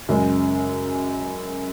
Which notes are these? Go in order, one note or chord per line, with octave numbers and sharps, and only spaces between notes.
F#2 C#3 G#3